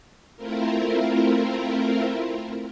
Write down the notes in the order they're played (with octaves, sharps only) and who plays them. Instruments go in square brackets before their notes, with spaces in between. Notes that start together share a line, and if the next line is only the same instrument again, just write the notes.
[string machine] A3 C4 E4 F4 A#4